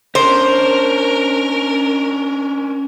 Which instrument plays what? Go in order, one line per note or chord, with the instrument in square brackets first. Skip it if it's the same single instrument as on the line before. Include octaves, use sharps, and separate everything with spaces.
[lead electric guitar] C#4 D4 [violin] A#4 [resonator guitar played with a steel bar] C5